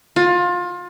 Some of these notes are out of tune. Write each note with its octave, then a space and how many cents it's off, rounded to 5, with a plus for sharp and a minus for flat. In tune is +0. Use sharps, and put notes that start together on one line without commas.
F4 +25